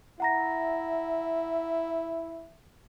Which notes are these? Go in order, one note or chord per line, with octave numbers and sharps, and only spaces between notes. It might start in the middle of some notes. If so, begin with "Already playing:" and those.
E4 E5 F#5 A#5 A#6